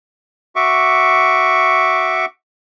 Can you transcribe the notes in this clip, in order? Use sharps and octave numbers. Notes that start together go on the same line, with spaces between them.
F#4 E5 C#6 D6